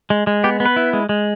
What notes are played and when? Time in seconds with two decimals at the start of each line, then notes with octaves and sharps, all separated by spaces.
0.10 G#3
0.27 G#3
0.44 B3 G4
0.60 B3
0.66 B4
0.76 E4
0.93 G#3
1.09 G#3